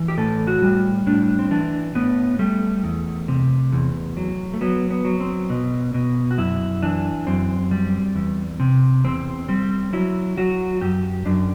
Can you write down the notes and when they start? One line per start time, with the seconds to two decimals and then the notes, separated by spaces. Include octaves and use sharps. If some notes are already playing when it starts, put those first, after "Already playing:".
Already playing: E3
0.08 G4
0.18 A2 A4
0.47 F#4
0.62 G3
1.07 A2 D4
1.39 C4
1.51 E3 D4
1.95 A2 B3
2.39 G3 A3
2.84 E2
3.28 C3
3.72 E2
4.17 F#3
4.54 A3
4.61 F#3 B3
4.91 B3
5.05 F#3
5.20 C4
5.50 B2
5.94 B2
6.31 F#4
6.38 F#2 E4
6.82 E3 D4
7.27 F#2 C4
7.71 G3
8.15 E2
8.60 C3
9.04 E2 C4
9.49 G3 C4
9.93 F#3 E4
10.37 F#3 F#4
10.81 F#2 G4
11.26 F#2 D4